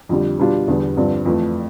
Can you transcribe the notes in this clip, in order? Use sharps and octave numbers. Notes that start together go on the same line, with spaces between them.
F2 D3 G3
B2 G3 D4 F4
E2 D3 G3 B3
G2 D3 F3 C4
F2 E3 A3